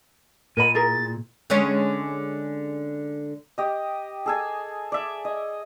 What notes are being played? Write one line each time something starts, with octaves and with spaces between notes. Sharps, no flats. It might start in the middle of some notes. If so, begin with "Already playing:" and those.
A#2 A#4 D#5 B5 D#7
E4 G#4 A#4 A6
D3 G#3 C#4
G4 D#5
G#4 A4 G#5
D5 E5
D#5